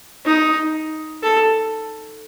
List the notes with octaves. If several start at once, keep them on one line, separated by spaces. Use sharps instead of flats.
D#4
A4